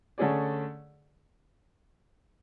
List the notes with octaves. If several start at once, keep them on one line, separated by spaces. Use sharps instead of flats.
D3 A3 C#4 G#4 D5